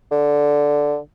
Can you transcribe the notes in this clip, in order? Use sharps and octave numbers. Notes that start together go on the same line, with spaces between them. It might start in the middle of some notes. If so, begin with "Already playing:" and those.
D3